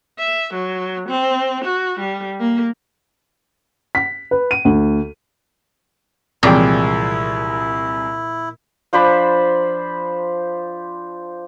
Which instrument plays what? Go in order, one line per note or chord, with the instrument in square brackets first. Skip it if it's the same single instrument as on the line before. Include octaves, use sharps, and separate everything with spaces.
[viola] E5
F#3
C4
F#4
G3
A#3
[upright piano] B6
B4
D#7
D2
[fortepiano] C2 G#3 G5 [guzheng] A#2 [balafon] E3 F3 C4 [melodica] E4
[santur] F3 D4 C5 B5